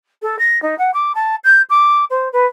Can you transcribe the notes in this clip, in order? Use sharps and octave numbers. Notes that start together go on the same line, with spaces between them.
A4
A#6
D#4
F#5
D6
A5
G6
D6
C5
B4